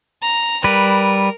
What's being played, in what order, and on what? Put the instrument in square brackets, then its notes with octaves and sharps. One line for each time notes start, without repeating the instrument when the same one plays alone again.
[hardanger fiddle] A#5
[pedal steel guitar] G3 B4 [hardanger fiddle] A#4